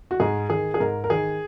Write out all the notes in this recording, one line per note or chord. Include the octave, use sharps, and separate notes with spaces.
F#4
G#2 G#4
D#3 G#4
G#4
G#2 A#4
A#4
D#3 G#4